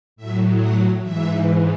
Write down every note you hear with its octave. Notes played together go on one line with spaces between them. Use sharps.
A2 F#3 E5
F#5
G#2 E3 E5